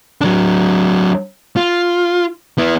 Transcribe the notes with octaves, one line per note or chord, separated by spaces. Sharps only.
F#3 D4
F4
B3 E4